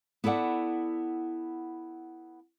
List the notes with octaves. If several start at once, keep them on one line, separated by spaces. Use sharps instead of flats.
B3 E4 A4 D5 F#5